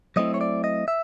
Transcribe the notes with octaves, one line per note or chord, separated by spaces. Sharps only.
F#3 A3 C4 E4 D#5
C#5
D5
D#5
E5